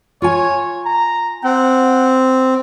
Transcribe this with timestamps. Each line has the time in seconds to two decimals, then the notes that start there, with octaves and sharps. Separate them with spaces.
0.22 F4 C#5 G#5
0.86 A#5
1.44 C4 F#5